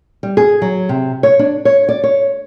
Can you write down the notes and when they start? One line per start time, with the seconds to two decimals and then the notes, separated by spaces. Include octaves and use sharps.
0.23 G3
0.37 G#4
0.62 F#3
0.89 C3
1.23 C#5
1.39 D4
1.65 C#5
1.89 D5
2.04 C#5